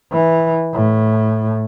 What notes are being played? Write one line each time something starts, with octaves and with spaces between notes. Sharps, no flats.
E3
A2